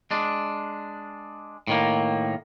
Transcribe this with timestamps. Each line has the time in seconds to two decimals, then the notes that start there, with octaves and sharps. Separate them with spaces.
0.11 G#3 D4
1.67 A2 D#3 A#3